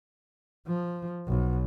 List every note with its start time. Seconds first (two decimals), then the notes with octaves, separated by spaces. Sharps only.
0.67 F3
1.27 B1